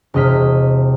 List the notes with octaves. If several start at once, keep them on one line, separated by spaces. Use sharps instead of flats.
E1 C3 D#5 F6 B6